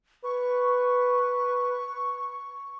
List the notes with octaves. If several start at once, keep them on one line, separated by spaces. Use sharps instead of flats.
B4 C#6